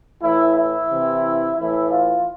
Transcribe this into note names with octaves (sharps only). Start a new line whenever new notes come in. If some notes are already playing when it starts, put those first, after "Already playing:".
A2 E3 E4
E4
C3 E3
A2 E3 E4
F4